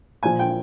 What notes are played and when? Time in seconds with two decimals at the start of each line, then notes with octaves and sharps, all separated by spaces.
0.23 A#2 F3 G#5
0.39 G5